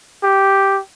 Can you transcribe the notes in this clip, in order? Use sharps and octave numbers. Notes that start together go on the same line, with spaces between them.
G4